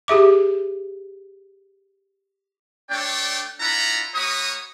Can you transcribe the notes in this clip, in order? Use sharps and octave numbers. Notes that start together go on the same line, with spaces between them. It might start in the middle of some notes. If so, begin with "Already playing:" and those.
G4 G#4 E5 D6
A3 D4 C#5 D5 G5
D4 E4 F4 F#5 A#5 B5
A#3 F#4 C#5 B5 D#6